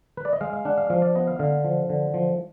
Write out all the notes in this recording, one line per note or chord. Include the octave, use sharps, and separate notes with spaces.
B4
D5
D#5
G#3 F5
F5
D4 F#5
F5
F3 F5
D5
B3 D#5
F5
D3 F5
F3
D3
F3